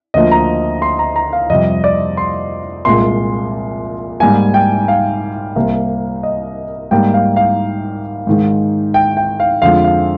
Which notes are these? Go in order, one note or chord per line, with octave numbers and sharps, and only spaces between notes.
D2 D3 F3 A#3 D#5
A#5
C6
A#5
A#5
F5
F2 C3 G3 D#5
D5
C6
C2 A#2 G#3 C6
G#2 G3 A#3 G#5
G5
F5
C2 C3 G3 A#3
D#5
G#2 G3 A#3 G5
F5
F5
G#2 D#3 G#3
G5
G5
F5
F2 D3 F3 G#3 F5
F5